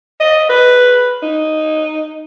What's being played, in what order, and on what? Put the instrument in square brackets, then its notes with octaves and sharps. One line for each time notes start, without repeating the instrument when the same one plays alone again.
[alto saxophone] D#5
B4
D#4